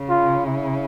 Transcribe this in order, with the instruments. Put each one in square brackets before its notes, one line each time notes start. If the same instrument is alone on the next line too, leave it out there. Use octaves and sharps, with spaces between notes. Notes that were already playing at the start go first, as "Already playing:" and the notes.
Already playing: [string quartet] C#3
[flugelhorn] F4
E4